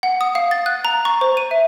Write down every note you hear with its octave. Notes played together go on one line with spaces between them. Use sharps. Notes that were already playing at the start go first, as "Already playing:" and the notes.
F#5
D#6
F5
A6
F#6
A#5
C#6
C5
D#7
E5